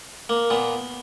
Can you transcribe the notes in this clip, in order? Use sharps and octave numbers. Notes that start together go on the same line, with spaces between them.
A#3
A#2 B3